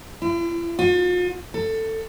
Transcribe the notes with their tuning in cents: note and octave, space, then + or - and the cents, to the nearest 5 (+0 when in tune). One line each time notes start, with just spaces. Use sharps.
E4 +45
F4 +45
A4 +15